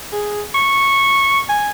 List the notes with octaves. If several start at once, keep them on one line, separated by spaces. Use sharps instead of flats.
G#4
C#6
G#5